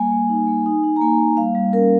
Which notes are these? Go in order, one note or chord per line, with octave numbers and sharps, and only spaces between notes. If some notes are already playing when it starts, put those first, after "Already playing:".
Already playing: G3 A#3 G#5
A#3
D#4
A#3
D#4
D#4
A#5
A#3 G#5
A#3
G3 F5
G3
C#4 A#4